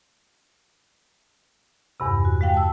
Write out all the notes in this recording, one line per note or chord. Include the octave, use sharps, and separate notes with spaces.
E2 G2 C3
F#4
G#3 F5 G5
A5 E6